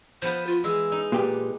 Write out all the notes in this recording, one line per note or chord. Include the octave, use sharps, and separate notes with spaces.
F3 B3 B4 C5
F4
E3 G#3 E6
D#4
A#2 G4 B4